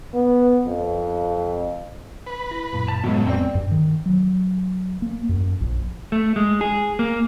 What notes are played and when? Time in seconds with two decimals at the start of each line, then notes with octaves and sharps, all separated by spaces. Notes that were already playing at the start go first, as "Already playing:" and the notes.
0.14 B3
0.67 F2
2.27 B4
2.51 E4 A#6
2.73 F#2 A#2 B6
2.88 A5
3.04 F#2 A2 C#3 F#3 G#3 B3 F#4
3.27 F2 B3 C4 D5 G5
3.55 G2
3.71 D#3
4.06 F#3
5.02 A#3
5.29 F#2
5.61 A#1
6.12 A3
6.36 G#3
6.61 G#4
6.99 A#3